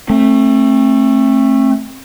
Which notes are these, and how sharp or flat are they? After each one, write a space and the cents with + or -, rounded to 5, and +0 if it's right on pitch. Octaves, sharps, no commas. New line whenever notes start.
A3 +0 C4 +35